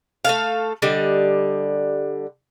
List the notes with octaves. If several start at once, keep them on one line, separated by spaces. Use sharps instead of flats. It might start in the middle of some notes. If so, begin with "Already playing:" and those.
A3 A4 F5
D3 G3 D#5